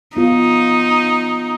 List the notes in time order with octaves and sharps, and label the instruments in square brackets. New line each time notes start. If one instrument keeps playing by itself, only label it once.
[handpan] B3 F4 [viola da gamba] D#4